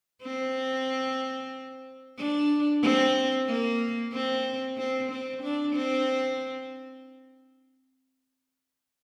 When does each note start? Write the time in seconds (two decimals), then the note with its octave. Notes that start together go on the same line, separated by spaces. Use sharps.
0.22 C4
2.18 D4
2.82 C4
3.48 A#3
4.12 C4
4.78 C4
5.11 C4
5.42 D4
5.75 C4